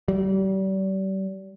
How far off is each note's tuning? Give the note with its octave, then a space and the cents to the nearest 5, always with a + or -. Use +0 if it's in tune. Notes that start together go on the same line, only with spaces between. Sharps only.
G3 -35